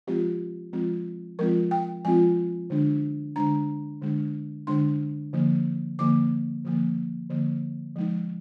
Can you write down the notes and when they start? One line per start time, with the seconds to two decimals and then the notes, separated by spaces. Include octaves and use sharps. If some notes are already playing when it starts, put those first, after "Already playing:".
0.07 F3 G#3 C4 F4 G4
0.73 F3 G#3 C4 F4
1.39 F3 G#3 C4 F4 A#4
1.71 G5
2.05 F3 G#3 C4 F4 G#5
2.70 D3 G#3 D4
3.36 D3 G#3 D4 A#5
4.02 D3 G#3 D4
4.67 D3 G#3 D4 C6
5.33 D3 F3 A#3
5.99 D3 F3 A#3 D6
6.64 D3 F3 A#3
7.30 D3 F3 A#3
7.96 F3 G#3 D#4